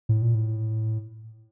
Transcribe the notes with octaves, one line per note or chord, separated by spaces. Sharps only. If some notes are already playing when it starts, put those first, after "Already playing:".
A2
A#2
A2